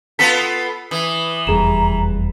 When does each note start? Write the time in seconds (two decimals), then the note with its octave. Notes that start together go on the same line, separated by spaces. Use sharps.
0.19 B3 F4 A4 B6
0.91 E3 D#6
1.47 F1 E2 G3 G#4 A#5 E7